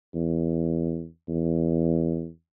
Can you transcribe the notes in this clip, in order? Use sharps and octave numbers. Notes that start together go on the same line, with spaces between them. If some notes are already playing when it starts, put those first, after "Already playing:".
E2
E2